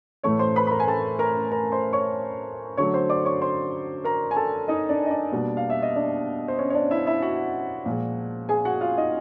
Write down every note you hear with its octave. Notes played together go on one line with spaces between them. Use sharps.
A2 E3 A3 C#5 C#6
C5 C6
B4 B5
B5
A#4 A#5
G#5
A4 A5
A#4 A#5
A#4 A#5
C5 C6
C#5 C#6
D3 F#3 A3 C#5 C#6
C5 C6
D5 D6
C#5 C#6
C5 C6
A#4 A#5
G#5
A4 A5
D#4 D#5
D4 D5
D#5
D4 D5
B2 G3 A#3
F5
E5
D#5
D4 D5
C5
C#4 C#5
C#5
D4 D5
E4 E5
E4 E5
F#4 F#5
A#2 F3 G#3
G#4 G#5
F#4 F#5
F4 F5
D#4 D#5